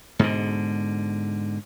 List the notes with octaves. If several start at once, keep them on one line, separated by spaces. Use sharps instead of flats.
G#2 B2 D3